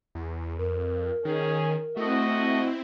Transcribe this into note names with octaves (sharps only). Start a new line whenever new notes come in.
E2
F2 A#4
D#3 C#4 G#4
A3 C4 E4 F#4 D#5